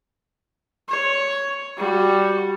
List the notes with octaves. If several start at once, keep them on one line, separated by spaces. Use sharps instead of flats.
C#5
G3 F#4